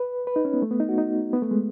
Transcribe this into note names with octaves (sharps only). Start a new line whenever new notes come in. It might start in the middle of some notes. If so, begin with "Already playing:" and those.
Already playing: B4
B4
D#4
C#4
B3
A3
B3
D#4
F#4
D#4
B3
A3
G#3